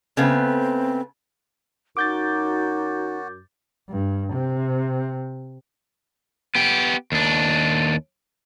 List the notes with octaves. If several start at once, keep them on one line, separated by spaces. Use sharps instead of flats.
C#3 A3 B3 C4
F#2 D#4 F#4 D6 G6 A6
G2
C3
B3 G4
D#2 D4